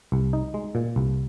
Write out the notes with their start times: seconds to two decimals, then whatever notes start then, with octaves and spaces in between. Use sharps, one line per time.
0.12 C2
0.33 D#4
0.54 G#3
0.75 A#2
0.96 C2